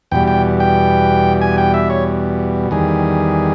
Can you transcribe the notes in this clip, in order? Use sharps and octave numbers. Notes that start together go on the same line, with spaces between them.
E2 B2 G3 G5
G5
G5
G#5
G5
E5
C#5
E2 D#3 G3 G#4